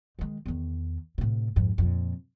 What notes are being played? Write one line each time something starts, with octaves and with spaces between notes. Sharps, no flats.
D#3 G#3
E2 D#3
A2 C3
F2 G#2
F2 A#2